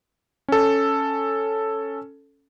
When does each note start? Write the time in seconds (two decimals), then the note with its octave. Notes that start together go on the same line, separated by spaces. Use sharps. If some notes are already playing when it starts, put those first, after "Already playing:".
0.48 C#4 A4